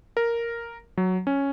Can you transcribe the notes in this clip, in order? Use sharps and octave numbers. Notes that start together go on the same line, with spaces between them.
A#4
F#3
C#4